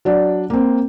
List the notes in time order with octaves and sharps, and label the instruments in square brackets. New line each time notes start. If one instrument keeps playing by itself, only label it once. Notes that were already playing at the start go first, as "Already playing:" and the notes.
[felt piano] F#3 D4 D5
A#3 C4